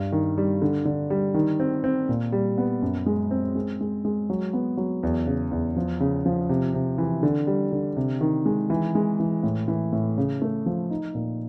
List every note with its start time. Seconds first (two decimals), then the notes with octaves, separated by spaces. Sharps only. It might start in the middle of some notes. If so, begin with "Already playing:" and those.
Already playing: G2
0.12 D#3
0.38 G3
0.62 D3
0.85 D3
1.10 G3
1.34 D#3
1.60 C4
1.84 C4
2.09 A#2
2.32 G3
2.58 B3
2.82 F#2
3.06 G#3
3.31 C4
3.56 G#3
3.81 G#3
4.05 G#3
4.30 F#3
4.53 B3
4.77 F#3
5.03 E2
5.27 C#3
5.51 E2
5.76 F3
6.00 C#3
6.26 F3
6.49 C3
6.74 C3
6.98 E3
7.23 D3
7.47 G3
7.72 D3
7.97 C3
8.21 D#3
8.46 G#3
8.70 E3
8.95 G#3
9.20 E3
9.43 A2
9.68 E3
9.93 A2
10.18 C#3
10.42 A3
10.66 F3
10.90 D#4
11.15 A#2